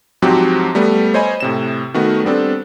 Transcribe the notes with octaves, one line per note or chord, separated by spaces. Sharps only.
G#2 F3 F#3 C4 F#4 G4
G3 A3 B3
C5 C#5 D#5 G#5 B5
A2 C3 E7
D#3 A3 B3 F#4
G3 B3 C4 D4 A4